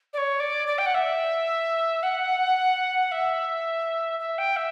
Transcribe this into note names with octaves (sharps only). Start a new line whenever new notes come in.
D5
C#5
D5
D5
G5
F#5
E5
F#5
E5
E5
G5
E5